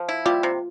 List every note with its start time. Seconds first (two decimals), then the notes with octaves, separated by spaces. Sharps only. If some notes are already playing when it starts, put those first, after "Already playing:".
Already playing: F3
0.09 E4
0.26 G3 F4
0.43 C3